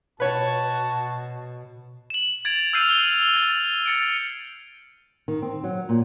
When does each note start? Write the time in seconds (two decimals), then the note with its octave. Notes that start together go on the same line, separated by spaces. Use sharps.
0.20 B2 F#4 B4 C#5 A5
2.10 E7 F#7
2.45 G#6 A6 D7 F7
2.73 E6 F6 G6 C7 D#7 F7
2.89 G7
3.37 A6
3.86 A6 C#7 D7
5.28 D#3
5.42 C4
5.64 F#3
5.89 A#2